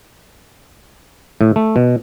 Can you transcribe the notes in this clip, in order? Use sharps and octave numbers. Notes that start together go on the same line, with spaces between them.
A2
A3
B2